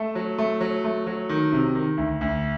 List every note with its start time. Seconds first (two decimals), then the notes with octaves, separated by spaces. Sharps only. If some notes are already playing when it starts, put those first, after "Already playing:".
Already playing: A3 A5
0.15 F#3
0.38 A3
0.61 F#3
0.84 A3
1.06 F#3
1.29 D#3
1.52 C3
1.75 D#3
1.97 D2
2.21 D2